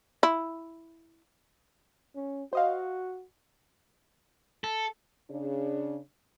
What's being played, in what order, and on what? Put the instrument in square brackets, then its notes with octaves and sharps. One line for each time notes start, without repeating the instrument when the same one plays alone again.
[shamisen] E4
[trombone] C#4
[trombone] F#4 [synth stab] C5 D#5 F5
[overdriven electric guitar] A4
[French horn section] C#3 D4